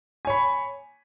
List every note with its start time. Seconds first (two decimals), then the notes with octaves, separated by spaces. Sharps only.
0.25 G#5
0.27 C#5
0.30 B5